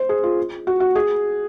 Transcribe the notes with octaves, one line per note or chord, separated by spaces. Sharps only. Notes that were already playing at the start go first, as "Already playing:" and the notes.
Already playing: C5
G#4
F4
F#4
F#4
G#4